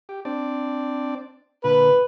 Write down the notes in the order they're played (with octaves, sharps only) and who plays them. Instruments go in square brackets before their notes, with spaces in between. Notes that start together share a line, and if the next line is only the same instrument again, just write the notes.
[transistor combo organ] G4
C4 D4 D5
[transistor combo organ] A#2 D3 [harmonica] B4